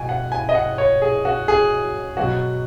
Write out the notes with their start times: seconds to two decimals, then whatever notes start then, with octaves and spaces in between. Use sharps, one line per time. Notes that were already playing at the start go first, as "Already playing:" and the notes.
Already playing: B2 G#5
0.09 F#5
0.32 G#5
0.49 D#5
0.55 F#5
0.78 C#5
1.02 G#4
1.25 F#4
1.48 G#4
2.17 B2 F#3 F#4